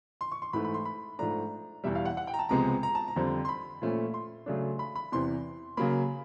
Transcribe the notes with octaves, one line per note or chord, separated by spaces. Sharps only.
C6
C#6
C6
G#2 E3 A3 B5
B5
C6
B5
G#2 F3 A3 D4 A#5
E2 B2 G3 E5
F5
F#5
F#5
G5
A#5
A5
C#2 C3 F3 G#3 B3 A#5
A#5
A5
A#5
F2 D3 G3 C4
C6
B5
A#2 F3 A3 C#4
C6
C#3 F#3 A3 D4
B5
B5
E2 C3 E3 C6
C#3 F#3 A#3 B5